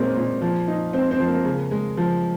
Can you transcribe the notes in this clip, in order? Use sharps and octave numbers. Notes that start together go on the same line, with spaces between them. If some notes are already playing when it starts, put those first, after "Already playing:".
Already playing: A#2 G#3 A#3 C4 C#4 D#4 A#4 C5
A#2
F3
D#4
C4 C5
C4 C5
F3
A#3 A#4
C#3
G#3
F3